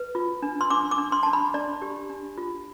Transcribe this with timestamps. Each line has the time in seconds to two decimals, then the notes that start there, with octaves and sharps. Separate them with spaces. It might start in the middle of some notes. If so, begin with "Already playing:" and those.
Already playing: B4
0.15 F4
0.43 D4
0.61 C6
0.70 D4 D6
0.91 D6
0.98 D4
1.12 C6
1.23 D4 A5
1.33 B5
1.54 D4 D5
1.82 G4
2.10 D4
2.38 F4